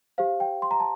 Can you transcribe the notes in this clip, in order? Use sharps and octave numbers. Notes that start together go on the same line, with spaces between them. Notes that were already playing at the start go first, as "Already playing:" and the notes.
G4 C5 F5
G5
C6
A#5
A5